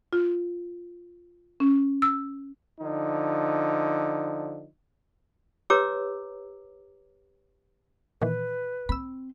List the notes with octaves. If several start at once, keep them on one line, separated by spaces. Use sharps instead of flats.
F4
C#4
E6
D3 F3 D#4
G4 B4 C#5 A#5 D6 E6
A#2 D#3 E3 B4
C4 B5 E6